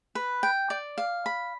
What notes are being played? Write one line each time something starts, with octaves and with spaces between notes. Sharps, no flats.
B4
G5
D5
F5
B5